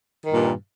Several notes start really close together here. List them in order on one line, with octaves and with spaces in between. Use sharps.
D#3 G2 A#2